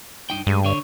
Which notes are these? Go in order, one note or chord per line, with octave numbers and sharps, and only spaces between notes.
G2 D#4 G5
G2 G#3
D3 C#5